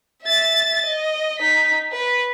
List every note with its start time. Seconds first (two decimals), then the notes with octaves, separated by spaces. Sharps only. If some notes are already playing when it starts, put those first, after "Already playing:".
0.22 E5 A6
0.85 D#5
1.38 D#4 B6
1.92 B4